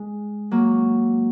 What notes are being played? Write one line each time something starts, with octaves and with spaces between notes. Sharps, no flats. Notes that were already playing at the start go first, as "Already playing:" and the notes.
Already playing: G#3
F#3 A#3